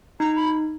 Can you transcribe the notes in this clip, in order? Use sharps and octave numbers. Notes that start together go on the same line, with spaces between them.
D#4 A#5
B5